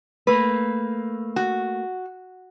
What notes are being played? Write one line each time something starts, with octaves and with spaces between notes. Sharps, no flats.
A3 A#3 B4
F#4